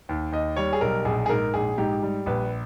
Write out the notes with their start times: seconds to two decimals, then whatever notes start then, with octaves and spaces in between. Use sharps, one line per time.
0.09 D#2
0.32 D#2 D#5
0.56 G3 C#5
0.73 G#4
0.81 B1 A#4
1.05 A#1 G#4
1.26 G#4
1.29 G#2 A#4
1.54 A#1 G#4
1.78 G#2 G4
2.03 G3
2.26 A#1 B4